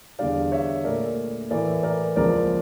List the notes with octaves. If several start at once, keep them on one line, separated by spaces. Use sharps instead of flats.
E2 D3 G3 D5 F5
C#5 E5
A#2 A3 A#4 D5
A2 E3 A3 A#4 D5
A#4 D5
C#2 C#3 F3 A#3 A#4 D5